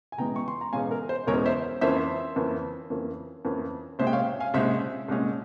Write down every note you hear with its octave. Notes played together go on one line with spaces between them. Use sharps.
G#5
E1 E2 E3 G#3 C#4 G5 A#5
C#6
C6
A#5
E1 E2 E3 G#3 C#4 F5 G#5
A#4
C5
E1 E2 E3 G#3 C#4 A#4 C#5
C5 E5
F2 E3 A#3 C#4 C5 E5
F2 E3 A#3 C#4
F2 E3 A#3 C#4
F2 E3 A#3 C#4
C2 A#2 G#3 C#4 C5 E5
G5
C#5 F5
F5 G#5
C2 A#2 G#3 C#4 C5 E5
C2 A#2 G#3 C#4